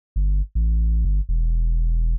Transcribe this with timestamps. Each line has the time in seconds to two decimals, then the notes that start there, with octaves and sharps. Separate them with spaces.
0.16 G1
0.55 A1
1.05 G1
1.29 E1